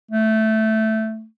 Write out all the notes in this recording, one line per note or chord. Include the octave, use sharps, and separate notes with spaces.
A3